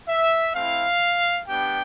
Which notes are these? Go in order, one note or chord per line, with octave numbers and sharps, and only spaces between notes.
E5
A3 C4 E4 F5
G3 B3 D4 G4 G5